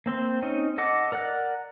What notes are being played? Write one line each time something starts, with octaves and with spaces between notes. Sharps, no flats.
A#3 C4 C6
C4 C#4 D#4
A4 D#5 F#5 D6
A#4 D5 F#5 F#6